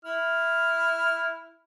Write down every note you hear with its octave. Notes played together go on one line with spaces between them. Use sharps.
E4 F6